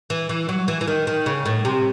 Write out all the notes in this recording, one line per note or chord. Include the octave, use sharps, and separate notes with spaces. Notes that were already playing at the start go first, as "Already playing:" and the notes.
E3
E3
F#3
E3
E3
D#3
D#3
C#3
A2
C3